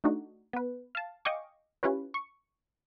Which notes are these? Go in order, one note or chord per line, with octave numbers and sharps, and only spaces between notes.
A3 D4 D#4 F#4
B3 B4
F5 A5
D#5 F5 G5 G#5 C#6 D6
C#4 E4 F4 G4 B4 C#5
C#6